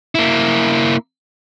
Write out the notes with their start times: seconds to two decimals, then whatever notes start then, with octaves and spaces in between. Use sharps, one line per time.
0.15 A#3 E4